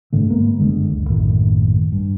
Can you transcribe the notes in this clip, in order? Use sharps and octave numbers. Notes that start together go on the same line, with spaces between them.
F#1 G#2 D3 A3
G#2 G#3 A#3 B3
G1 F#2 D3 G#3
D2
A#1 F#2 A2 D#3
G2